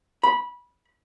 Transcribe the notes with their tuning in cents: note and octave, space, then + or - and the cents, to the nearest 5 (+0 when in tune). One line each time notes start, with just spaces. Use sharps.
B5 -20